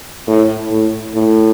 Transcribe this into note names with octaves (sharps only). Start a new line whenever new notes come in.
A2
A2
A2